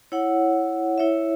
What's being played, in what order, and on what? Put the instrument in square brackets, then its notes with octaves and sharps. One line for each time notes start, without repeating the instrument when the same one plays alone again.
[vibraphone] E4 C#5 F#5
E4 C#5 E5